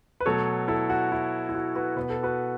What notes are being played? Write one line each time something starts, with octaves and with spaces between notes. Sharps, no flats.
B4
B2 F#3 A3 A4 C#5
E4 A4
F#4
E4
E4
F#4
F#4 B4
B2 B3 B4
A4
F#4 B4